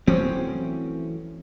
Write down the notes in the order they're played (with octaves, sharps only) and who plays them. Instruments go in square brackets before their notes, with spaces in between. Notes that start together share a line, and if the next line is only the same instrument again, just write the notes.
[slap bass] E3 F#3 A3 [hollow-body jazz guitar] C4 C#4